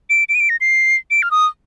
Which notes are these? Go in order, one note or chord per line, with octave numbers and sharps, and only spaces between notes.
D7
D7
D#7
D7
A#6
C7
D7
F6
D#6